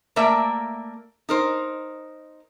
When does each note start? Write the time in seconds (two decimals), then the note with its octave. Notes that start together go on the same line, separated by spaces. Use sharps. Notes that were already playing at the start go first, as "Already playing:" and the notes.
0.16 A3 A#3 A#4 D5 E5
1.29 D#4 A#4 C5